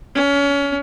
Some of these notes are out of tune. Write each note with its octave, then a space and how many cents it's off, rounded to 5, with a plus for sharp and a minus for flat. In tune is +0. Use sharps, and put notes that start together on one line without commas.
C#4 +30